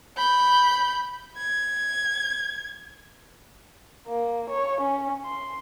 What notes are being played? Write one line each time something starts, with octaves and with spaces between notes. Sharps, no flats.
B5 G6
G#6
A#3
C#5
C#4
C6